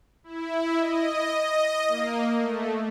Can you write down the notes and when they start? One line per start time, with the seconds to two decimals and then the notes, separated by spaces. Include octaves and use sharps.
0.24 E4
0.79 D#5
1.37 D#5
1.88 A#3
2.38 A3